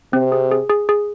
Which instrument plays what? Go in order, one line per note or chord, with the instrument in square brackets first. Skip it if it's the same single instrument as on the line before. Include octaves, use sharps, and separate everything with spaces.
[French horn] C3 [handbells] C4
[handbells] G#4
G#4
G#4
G#4